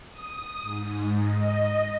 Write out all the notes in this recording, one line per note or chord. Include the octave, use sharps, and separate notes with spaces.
D#6
G#2
D#5